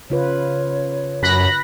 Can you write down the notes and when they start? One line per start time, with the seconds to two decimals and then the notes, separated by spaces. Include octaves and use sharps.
0.10 C#3 F4 B4 C#5
1.23 F#2 B5 F#6 A#6